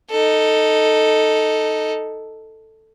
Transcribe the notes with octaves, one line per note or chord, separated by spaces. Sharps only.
D#4 A4